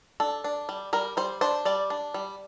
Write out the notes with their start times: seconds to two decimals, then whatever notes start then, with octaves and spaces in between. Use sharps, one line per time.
0.20 D4 A4
0.44 D4
0.69 G3
0.93 G3 A#4
1.17 G3 C5
1.41 D4 C5
1.65 G3 D5
1.90 D4
2.14 G3